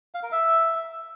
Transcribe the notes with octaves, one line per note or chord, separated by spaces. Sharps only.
F5
A#4
E5